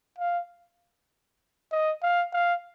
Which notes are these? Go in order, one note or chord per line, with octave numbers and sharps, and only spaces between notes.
F5
D#5
F5
F5